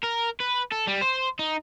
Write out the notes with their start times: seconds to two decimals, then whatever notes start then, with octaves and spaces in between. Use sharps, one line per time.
0.04 A#4
0.40 B4
0.72 A4
0.87 G3
1.01 C5
1.39 D#4